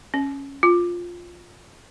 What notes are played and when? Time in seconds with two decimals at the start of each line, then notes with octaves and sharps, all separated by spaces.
0.14 C#4
0.63 F4